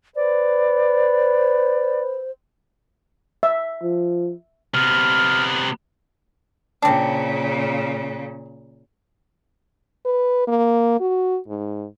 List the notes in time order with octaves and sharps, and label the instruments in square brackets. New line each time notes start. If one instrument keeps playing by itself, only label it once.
[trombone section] B4 [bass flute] C5 [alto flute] D5
[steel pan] E5
[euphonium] F3
[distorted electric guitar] C3 B3 [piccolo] F6
[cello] A#2 C#3 [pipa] C4 D4
[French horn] B4
A#3
F#4
G#2